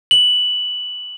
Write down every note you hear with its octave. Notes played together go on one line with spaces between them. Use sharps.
F#7